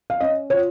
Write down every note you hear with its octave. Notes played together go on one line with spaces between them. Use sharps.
F5
C#4 D#5
F4 C#5